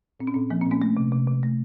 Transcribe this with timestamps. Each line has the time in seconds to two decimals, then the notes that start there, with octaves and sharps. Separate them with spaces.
0.20 A#2 C4
0.27 C#4
0.34 A#2 C4
0.50 F3 A#3
0.61 C4
0.66 A#2
0.71 A#3 C#4
0.82 A3
0.97 C3
1.12 C3
1.27 C3
1.43 A3